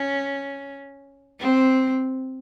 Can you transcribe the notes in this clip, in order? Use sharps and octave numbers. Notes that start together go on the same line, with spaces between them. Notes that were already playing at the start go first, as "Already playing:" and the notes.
Already playing: C#4
C4